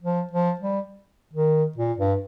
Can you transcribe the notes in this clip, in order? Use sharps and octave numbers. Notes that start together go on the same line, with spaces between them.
F3
F3
G3
D#3
A#2
G2